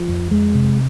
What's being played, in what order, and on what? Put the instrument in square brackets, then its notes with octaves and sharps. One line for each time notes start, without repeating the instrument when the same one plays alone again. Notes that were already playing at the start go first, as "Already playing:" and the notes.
Already playing: [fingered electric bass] F3
F2
F2 G#3
C3